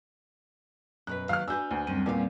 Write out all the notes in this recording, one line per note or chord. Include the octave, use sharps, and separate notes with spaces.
F#2 B2 B4 F#6
D#3 F#3 F5 F6
D4 F#4 B4 G#5 E6 G6
D2
F#2 G3 C4
E2 A#2 C#4 F5